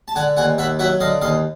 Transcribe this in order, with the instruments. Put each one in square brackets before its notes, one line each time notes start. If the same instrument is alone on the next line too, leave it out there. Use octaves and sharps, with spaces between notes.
[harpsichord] A5
D3 F#5 G#5
D#2 F#5 G#5
D#2 E5 F#5
F#3 E5 F#5
D3 D#5 F5
D#2 D#5 F5